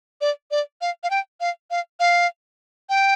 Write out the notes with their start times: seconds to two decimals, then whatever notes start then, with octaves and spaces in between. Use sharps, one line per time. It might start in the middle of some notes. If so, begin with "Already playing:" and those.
0.21 D5
0.51 D5
0.81 F5
1.03 F5
1.10 G5
1.41 F5
1.71 F5
2.00 F5
2.89 G5